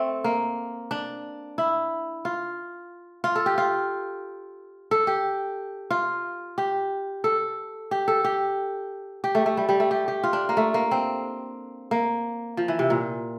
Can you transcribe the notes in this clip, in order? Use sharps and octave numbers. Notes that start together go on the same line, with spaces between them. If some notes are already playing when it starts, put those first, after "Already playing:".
Already playing: A3 C4
A#3
D4
E4
F4
F4
A4
G4
F4
A4
G4
F4
G4
A4
G4
A4
G4
G4
A3
A3
G3
G3
A3
G4
G4
F4
D4
A#3
A3
A#3
C4
A#3
F3
E3
C3
A#2